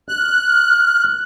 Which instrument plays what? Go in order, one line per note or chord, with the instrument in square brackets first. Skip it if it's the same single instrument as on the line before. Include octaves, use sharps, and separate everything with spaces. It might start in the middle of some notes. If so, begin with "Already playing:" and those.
[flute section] F6 [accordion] F#6